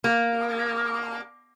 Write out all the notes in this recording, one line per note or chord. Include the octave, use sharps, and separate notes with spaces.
A#3